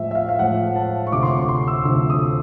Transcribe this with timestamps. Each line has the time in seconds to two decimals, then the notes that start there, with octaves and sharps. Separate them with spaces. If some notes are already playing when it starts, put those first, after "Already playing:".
Already playing: A2 F3 G#3 E5
0.11 E5
0.15 F5
0.29 F5
0.39 A2 F3 G#3 F#5
0.76 A5
1.07 C#6
1.12 D2 C3 F3 D6
1.23 C6
1.31 C#6
1.49 C6
1.68 E6
1.85 D2 C3 F3 E6
2.10 D#6